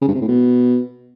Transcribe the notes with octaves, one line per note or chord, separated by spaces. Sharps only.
C#3
G2
C3
A2
B2